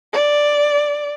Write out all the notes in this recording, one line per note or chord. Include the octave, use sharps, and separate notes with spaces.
D5